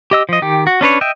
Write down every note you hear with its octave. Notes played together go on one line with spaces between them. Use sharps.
G4 D#5 E6
F3 D#5
D#3 G4
F#4
C#4 D4 B4 C#5
D#5 E5 G5